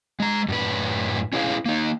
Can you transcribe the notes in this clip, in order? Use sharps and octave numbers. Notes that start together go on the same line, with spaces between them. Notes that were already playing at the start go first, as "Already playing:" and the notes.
G#3 A#5
F#2 A2 B4
C#4 E4 G#4 B4 F5
A#3 D#4